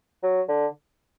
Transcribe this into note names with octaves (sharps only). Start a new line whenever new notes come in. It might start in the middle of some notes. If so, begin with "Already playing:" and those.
F#3
D3